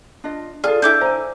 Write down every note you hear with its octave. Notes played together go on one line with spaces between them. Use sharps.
D4 F4 D#5
F4 G#4 A4 D5
D4 E4 A4 E5 D6 G6
C5 G#5 A#5